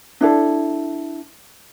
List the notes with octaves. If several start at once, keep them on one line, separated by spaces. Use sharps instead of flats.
D4 E4 A4